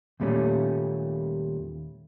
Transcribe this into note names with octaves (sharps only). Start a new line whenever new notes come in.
D#2 A#2 G3 A3 C#4